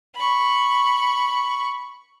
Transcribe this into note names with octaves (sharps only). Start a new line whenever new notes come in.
B5 C#6